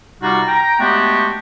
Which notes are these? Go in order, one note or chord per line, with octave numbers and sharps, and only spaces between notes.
C3 G3 D#4 F4 F#4
G5 A#5
G#3 A3 B3 D4 F#4 G4